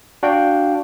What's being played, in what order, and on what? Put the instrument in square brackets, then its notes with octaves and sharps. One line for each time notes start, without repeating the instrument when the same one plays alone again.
[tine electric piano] D4 F#4 D5 F5 G5